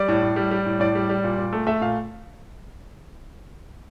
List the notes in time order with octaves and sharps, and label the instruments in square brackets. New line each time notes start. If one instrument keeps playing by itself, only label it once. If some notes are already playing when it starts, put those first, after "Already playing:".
Already playing: [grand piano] G3 D5
A2
A2
G3
G3
A2
A2 D5
G3
G3
A#2
A#2
A3
A3 E5
A#2 F5